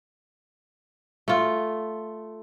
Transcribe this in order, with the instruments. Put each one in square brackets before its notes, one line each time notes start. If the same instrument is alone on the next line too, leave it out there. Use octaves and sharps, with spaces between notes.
[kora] A3 F4